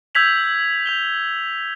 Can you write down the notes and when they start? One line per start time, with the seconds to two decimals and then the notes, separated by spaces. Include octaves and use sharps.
0.15 E6 G6 G#6 B6 F7 F#7
0.86 G6 F7 G7